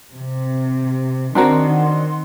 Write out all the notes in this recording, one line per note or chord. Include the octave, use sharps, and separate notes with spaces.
C3
D#3 C4 D4 F#4 A#4 F#5 C6